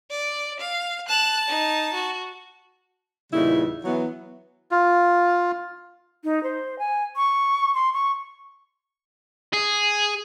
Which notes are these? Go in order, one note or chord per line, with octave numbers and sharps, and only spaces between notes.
D5
F5
A5 F#6 E7
D#4
F#4
E2 A#2 C#3 G3 D#4 E4
E3 F#3 B3
F4
D#4
C5
G#5
C#6
C6
C#6
G#4